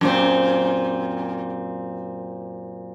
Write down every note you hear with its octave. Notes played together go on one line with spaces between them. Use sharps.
F#2 A#2 C4